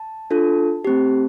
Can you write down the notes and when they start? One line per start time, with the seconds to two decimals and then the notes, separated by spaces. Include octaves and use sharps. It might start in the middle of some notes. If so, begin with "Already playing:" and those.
Already playing: A5
0.31 D4 F4 A4
0.85 A3 C4 G4